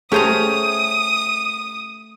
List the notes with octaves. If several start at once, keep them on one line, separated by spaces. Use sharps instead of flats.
A3 C#4 G4 G#4 C5 A#5 D#6